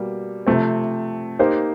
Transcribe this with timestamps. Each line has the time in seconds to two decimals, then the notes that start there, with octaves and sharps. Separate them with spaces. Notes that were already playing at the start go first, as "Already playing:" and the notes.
Already playing: B2 G3 A#3
0.47 C3 F3 A3 C4
1.39 A#3 D#4 G4 C5